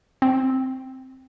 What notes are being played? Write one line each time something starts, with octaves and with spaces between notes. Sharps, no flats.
C4